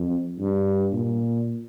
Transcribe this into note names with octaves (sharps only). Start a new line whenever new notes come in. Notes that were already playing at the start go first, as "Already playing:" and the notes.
Already playing: F2
G2
A#2